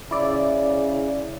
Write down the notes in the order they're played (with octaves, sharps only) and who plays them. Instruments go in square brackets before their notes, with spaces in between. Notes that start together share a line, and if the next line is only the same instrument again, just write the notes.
[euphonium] C#3 [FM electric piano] E4 D5